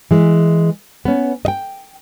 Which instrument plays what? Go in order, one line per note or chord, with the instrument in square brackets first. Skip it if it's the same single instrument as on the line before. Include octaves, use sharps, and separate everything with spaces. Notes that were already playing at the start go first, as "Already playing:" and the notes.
[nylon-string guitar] E3 G#3
B3 C#4
D#5 G5